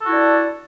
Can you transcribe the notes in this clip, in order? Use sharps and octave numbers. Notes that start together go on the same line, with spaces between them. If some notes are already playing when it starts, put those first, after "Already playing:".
D4 E4 F#4 A4 D5